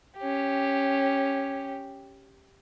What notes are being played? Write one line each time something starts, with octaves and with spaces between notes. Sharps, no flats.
C#4 G4